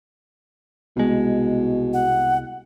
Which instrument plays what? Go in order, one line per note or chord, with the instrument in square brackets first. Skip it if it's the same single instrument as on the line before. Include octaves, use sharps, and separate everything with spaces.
[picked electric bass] C2 G#3 [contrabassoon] B2
[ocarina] F#5